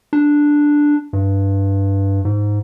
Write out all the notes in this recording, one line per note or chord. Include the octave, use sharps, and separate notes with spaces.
D4
G2
G#2